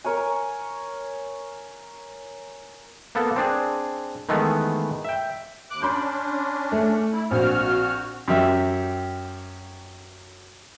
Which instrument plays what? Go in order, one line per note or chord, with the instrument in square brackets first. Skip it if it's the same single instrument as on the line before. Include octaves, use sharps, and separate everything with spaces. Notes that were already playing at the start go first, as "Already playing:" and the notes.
[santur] A#4 C#5 G#5
[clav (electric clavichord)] A#3 B3 A4
C4 D4 G#4
D#3 E3 G#3 A3 B3
E5 G5
[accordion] D#2 D6 F#6
[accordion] C#4 D4 [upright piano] B5 C6 G6
[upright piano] A3
[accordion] E4
[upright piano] A#1 C4 [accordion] F#4 F6
[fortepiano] F#2 G4 E5